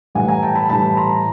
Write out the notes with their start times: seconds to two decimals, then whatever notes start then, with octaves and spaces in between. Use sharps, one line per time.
0.15 A2 E3 G3 F#5 G#5
0.28 G#5 A#5
0.43 G5 A5
0.55 A5 B5
0.69 A2 E3 G3 A5 B5
0.97 A#5 C6